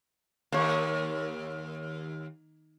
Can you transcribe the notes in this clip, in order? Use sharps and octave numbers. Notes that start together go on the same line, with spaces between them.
D#2 A#3 C#5